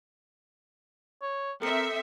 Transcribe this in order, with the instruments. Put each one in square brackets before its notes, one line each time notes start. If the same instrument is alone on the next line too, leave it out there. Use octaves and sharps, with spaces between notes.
[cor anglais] C#5
[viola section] C4 E5 [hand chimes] A4 C#7 [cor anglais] A#4